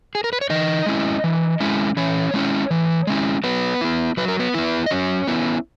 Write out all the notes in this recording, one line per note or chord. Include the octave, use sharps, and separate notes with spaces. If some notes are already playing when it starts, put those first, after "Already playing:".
G#4
A#4
B4
C#5
E3 D#4 D#5
G#3 C#4 E4
E3
G#3 C#4 E4
E3 C#4 C#5
G#3 C#4 E4
E3
G#3 C#4 E4
F#3 B3 B4
B3 E4
F#3 B4
A#4
B3 B4
B3 E4
D#5
F#3 C#4 C#5
B3 E4